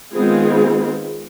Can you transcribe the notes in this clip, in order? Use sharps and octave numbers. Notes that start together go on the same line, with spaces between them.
D#3 G#3 B3 C4 F4 G#4